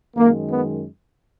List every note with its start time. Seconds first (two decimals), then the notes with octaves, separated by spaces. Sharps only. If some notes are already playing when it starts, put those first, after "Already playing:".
0.17 F#2 D#3 G#3 A#3
0.51 B3